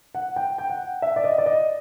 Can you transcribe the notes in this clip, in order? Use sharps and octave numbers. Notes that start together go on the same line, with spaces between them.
F#5
G5
G5
F#5
E5
D5
D#5
D5
D#5